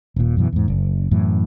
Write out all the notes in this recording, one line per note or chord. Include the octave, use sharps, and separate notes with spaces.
D#1 A#2
F#2 B2 E3
E2 G#2
F#1
F#2 A2 E3